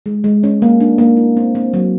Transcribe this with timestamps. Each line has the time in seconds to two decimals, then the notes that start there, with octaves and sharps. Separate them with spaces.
0.06 G#3
0.24 G#3
0.44 C#4
0.62 A#3
0.80 D4
0.98 A#3
1.17 E4
1.37 C4
1.55 C4
1.74 F#3